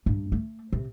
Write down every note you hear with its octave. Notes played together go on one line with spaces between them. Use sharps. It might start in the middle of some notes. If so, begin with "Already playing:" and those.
G2
A3
C3